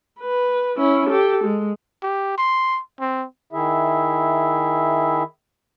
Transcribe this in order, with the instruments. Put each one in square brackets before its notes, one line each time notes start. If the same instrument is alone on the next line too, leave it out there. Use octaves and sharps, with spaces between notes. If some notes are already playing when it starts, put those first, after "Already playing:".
[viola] B4
C#4 E4
G4 A4
G#3
[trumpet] G4
C6
C4
[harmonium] D#3 E4 G#4 E5